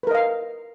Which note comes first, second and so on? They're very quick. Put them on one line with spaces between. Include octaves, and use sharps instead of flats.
B4 A#4 D#5 F5